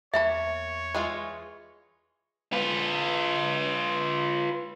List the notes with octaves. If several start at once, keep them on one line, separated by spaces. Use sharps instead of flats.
E2 A#3 C#5 E5 A5 B5
E3 G#3 F4
F4 B4